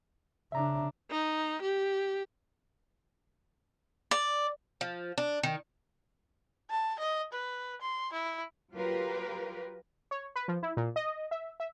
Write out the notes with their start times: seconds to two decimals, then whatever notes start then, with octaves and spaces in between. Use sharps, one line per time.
0.52 C#3 D4 E5 A#5
1.11 D#4
1.62 G4
4.11 D5
4.81 F3
5.18 D4
5.43 D#3
6.70 A5
6.99 D#5
7.32 B4
7.81 C6
8.13 E4
8.73 F#3 F4 G4 A#4 B4
10.11 C#5
10.36 B4
10.48 F3
10.63 E4
10.77 A#2
10.96 D#5
11.31 E5
11.60 E5